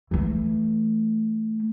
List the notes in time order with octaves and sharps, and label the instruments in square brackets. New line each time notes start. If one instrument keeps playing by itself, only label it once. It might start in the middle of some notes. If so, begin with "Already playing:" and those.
[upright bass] E3 A3